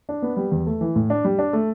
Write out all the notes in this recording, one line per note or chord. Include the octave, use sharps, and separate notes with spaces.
D4
B3
G3
E2
A3
E3
A2
D4
G3
D4
A3